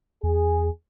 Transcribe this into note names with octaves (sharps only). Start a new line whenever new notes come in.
E2 G#4